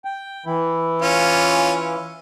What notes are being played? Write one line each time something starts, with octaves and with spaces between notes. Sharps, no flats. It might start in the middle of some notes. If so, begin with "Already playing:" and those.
G5
E3 E4
C#4 F4